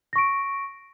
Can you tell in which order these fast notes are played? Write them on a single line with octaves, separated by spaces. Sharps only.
A#6 C#6 D7